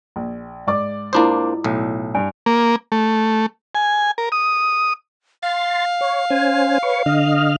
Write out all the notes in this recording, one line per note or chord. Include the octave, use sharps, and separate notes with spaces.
A#1
G#2 D5 D6
A#3 D4 E4 F4 C5 D#6
B1 A2
G2 G#5
A#3
A3
G#5
A#4
D#6
F5 C6 A6
C#5
C#4 C5 G#5
B4 C#5 C#6
D3 D#5 F6